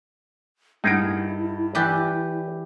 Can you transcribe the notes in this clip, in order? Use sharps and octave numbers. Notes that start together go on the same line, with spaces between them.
G2 D#4 E4 G#4 A#4 F#5 D7
E3 G4 B4 D5